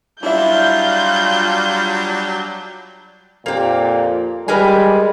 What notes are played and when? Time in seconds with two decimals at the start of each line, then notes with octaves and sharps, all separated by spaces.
0.23 F#3 G3 D4 E4 F4 E5 G6
3.46 F2 A#2 A#3 G4
4.48 G3 G#3 A#4 B4 G#5